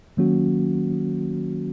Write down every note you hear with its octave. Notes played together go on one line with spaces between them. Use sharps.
D#3 F#3 A#3 C#4 F#4